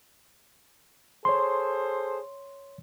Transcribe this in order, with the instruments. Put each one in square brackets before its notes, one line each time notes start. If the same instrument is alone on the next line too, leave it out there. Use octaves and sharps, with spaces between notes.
[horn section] G#4 A4 C5 [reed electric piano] C#5 C6